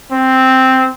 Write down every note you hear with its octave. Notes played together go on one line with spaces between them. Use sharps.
C4